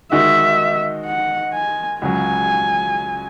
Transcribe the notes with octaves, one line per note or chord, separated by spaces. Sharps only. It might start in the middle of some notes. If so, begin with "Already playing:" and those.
D#3 G#3 D#4 F#4 E5
F#5
G#5
C#2 C#3 F#3 G#5